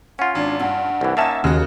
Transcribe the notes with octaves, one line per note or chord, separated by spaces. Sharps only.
C#4 F4 F#5
G#1 D4
G2 F#5
C2 E3
A#3 C#4 D#4 E5 A5 E7
D#2 C#3 G#3 F#4